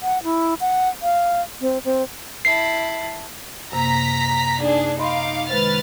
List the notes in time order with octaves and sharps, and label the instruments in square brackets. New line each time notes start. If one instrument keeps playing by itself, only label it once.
[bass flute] F#5
E4
F#5
F5
C4
C4
[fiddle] E4 A5 [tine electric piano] C7
[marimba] F#2 C3 A#3 [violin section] A#5 B6
[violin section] D4 G#4 [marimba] D#4
[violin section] D#4 F5 D6 [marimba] D#5 B5 C6
[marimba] D#3 G#3 C5 [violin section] B4 F6 A6